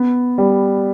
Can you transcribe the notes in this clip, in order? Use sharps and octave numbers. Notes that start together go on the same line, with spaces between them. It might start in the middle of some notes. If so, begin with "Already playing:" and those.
Already playing: B3
G3